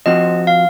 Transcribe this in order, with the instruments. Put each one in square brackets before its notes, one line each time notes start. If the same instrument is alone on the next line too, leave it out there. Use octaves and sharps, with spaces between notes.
[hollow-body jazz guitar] F3 C4 F#4 [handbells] D#5
[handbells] F5